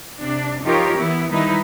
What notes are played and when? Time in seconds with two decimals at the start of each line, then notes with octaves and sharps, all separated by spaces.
0.18 C3 D4
0.63 F3 D#4 F4 G4 A#4 C#5
0.96 E3 B3 E4
1.31 D#3 G3 D#4 E4 B4